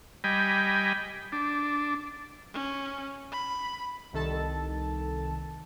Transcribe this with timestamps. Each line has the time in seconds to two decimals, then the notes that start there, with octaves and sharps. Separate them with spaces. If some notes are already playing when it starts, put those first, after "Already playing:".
0.24 G3 D#5 G5 G#5 B5
1.32 D4
2.54 C#4
3.32 B5
4.13 C2 D#3 A4 A5